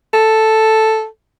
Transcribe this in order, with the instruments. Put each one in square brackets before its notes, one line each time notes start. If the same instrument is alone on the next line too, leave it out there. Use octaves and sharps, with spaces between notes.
[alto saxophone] A4